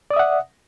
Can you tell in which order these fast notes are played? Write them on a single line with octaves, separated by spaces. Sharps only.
D5 D#6 E5 F#5